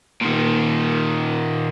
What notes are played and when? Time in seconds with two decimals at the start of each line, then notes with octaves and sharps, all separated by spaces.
0.21 A#2 D#3